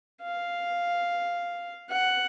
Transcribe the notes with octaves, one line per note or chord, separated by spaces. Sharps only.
F5
F#5